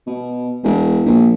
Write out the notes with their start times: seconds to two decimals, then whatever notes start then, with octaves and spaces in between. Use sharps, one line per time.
0.07 B2
0.64 E1
1.06 A#1